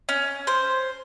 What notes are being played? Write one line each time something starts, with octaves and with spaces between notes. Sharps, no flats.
C#4
C5